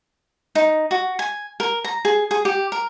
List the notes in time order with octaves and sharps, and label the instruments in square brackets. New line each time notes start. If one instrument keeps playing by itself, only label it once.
[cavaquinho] D#4
F#4
G#5
A#4
A#5
G#4
G#4
G4
A#4